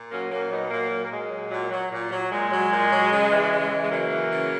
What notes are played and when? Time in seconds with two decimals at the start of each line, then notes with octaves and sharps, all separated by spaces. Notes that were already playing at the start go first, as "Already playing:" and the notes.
Already playing: A#2
0.10 F#3 A#3 C#4
0.30 A#2 A#3 C#4
0.50 F#3 B3 D#4
0.70 A#2 F#3 A#3
0.91 F#3
1.05 A#3
1.10 A#2 G#3
1.31 F#3
1.50 A#2 F#3
1.70 F#3
1.91 A#2
2.11 F#3
2.31 A#2 G#3
2.50 F#3
2.70 A#2
2.90 F#3
3.11 C#3
3.31 E3
3.51 C#3
3.71 E3
3.81 G#3
3.90 C#3 F#3 A#3
4.10 E3
4.31 C#3